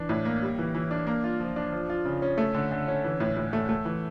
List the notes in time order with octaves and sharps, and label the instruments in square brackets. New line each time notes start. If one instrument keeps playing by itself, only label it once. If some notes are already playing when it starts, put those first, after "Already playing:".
Already playing: [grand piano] E3 D4
A2
A#3
G3
E3
E3
D4
A#3
F4
F3
D4
F3
F4
C#3
C#4
A3
D3
D3
C#4
E3
A2
A2
A3
A3
E3